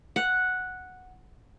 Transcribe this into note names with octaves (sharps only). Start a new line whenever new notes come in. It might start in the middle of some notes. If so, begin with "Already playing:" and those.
F#5